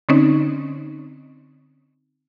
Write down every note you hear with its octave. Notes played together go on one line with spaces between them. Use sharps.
D3 C4 C#4 D#4